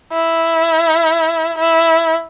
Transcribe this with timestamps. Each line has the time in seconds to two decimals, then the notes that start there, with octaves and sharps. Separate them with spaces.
0.12 E4
1.58 E4